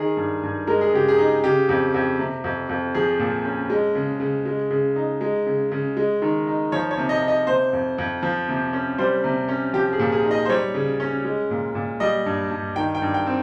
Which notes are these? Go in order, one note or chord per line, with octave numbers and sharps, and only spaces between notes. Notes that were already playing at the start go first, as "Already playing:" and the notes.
Already playing: D#3 G#4
G2
G2
G#3 A#4
G#4
C#3 G4
G#4
D#4
C#3 G4
F2
F2
C3
F2
F2
F3 G#4
A#2
C#4
G#3
C#3
C#3
G#3
C#3
D#4
G#3
C#3
C#3
G#3
D#3
D#4
F3 C#5
C#5
C3
D#5
D#4
D#5
C3 C5
F2
F2
F3
C3
C#4
G3 C5
C3
C#4
F3 G4
G#4
A#2
G#4
D#4
D#5
C5
G3 C#5
C#3
C#4
G#3
A#2
A#2
G3 D#5
G2
G2
D#3 G5
G5
G2
G5
C4